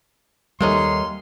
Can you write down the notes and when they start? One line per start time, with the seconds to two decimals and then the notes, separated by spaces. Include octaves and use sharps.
0.61 D#2 C3 G3 C#4 D#4 A4 E5 C6